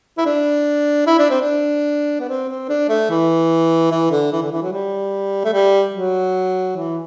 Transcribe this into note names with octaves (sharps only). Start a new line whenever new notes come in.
E4
D4
E4
D4
C4
D4
B3
C4
C4
D4
A3
E3
E3
D3
E3
D3
E3
F#3
G3
A3
G3
F#3
E3